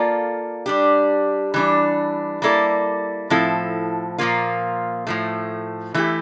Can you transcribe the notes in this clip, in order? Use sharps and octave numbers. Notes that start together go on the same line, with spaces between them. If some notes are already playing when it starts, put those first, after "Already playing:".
Already playing: A#3 F4 A4 D5
G3 D4 G4
E3 G3 D4
G3 A#3 E4 A4 D5
A2 F3 C4 E4 A4
A#2 F3 A#3 F4
A2 F3 A3
E3 A3 E4 G4